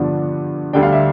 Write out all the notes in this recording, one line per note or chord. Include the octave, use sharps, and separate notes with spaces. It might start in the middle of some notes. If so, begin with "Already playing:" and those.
Already playing: G2 D3 F3 B3 D4
D2 D3 G3 D4 G5
F5
E5